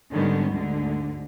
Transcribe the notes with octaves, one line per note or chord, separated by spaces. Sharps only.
G#2 D3 D#3 G3 B3 C#4
D2 G#2 D3